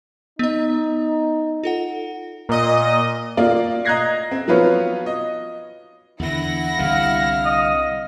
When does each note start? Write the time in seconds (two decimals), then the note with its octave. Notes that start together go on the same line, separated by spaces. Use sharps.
0.39 B3 D#4 D#5
1.64 F4 A4 F#5
2.49 A#2 D#5
3.37 A#3 F4 D5
3.85 D#5 A#5 F#6 G#6 A#6 C7
4.31 C4
4.48 F3 F#3 B3 F4 B4 C#5
5.06 D#5
6.20 E2 D3 E4 F#5 A#6
6.79 C2 D3 F5
7.45 D#5